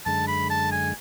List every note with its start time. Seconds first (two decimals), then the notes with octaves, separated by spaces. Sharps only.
0.06 F#2 D3 G#3 A5
0.28 B5
0.50 A5
0.71 G#5